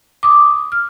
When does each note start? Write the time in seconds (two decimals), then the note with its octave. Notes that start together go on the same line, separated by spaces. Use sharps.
0.23 D6 D#6
0.72 F6